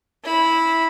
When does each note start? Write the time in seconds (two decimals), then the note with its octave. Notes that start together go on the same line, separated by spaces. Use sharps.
0.24 E4 B5